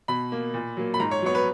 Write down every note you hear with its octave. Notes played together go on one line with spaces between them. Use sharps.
B2 B5
A#3
A#2
F#3 A#3
B5
G#2 A#5
C#5
F#3 B3 C#5
B4